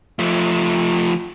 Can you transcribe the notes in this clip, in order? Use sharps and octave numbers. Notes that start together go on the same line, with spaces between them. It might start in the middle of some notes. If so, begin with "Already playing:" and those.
F3 A3